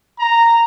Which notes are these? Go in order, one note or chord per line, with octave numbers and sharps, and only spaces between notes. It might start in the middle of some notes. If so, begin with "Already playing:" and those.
A#5